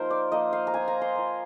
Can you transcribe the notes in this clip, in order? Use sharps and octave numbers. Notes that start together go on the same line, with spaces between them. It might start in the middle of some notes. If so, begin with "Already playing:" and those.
Already playing: F3 A#3 D#4 F4 A#4 C5
D5
F3 A#3 D#4 D#5
F5
A#5
A#3 F4 G#5
A#5
C6
A#3 F4